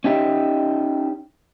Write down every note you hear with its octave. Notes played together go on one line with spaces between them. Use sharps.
C#4 D#4 G4 E5